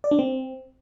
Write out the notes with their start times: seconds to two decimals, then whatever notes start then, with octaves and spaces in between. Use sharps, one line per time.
0.04 D5
0.11 D4
0.19 C4